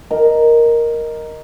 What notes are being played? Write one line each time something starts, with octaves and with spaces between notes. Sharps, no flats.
A#4 D#5